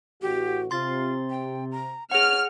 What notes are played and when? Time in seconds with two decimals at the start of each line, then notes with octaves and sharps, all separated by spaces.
0.22 A1 F#4 G4
0.71 C3 F4 C6 A6
1.30 G5
1.71 A#5
2.11 G#4 C#5 F#5 F6